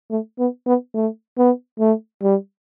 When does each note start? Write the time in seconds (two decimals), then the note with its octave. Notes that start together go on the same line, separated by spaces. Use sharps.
0.11 A3
0.39 B3
0.67 B3
0.94 A3
1.38 B3
1.79 A3
2.22 G3